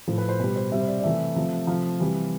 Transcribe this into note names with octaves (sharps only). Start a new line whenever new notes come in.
A2 F3 A3 C5
B4
C5
B2 G3 B4
C5
C3 G3 E5
C5
D5
D5
C3 E3 A3 E5
C3 F3 A3
C3 F3 A3 F5
C3 E3 G3